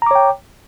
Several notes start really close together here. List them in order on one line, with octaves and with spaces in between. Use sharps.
A#5 D6 C#5 G5